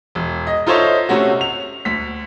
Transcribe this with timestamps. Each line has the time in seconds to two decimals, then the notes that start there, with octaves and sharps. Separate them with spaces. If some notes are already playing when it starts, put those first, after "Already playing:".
0.15 E1
0.47 D#5
0.67 D#4 F4 A4 C5 C#5 E5
1.09 C3 A3 C#4 F#4
1.41 F7
1.85 D2 B6